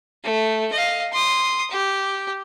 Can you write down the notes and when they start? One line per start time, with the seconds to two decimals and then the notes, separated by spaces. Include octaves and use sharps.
0.24 A3
0.73 D#5 F5
1.13 C6 D#6
1.71 G4